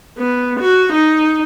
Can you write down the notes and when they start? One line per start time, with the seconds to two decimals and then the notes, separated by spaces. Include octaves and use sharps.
0.18 B3
0.60 F#4
0.93 D#4